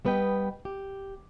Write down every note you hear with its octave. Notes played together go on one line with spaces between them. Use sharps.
G3 B3 B4 D#5 G5
G4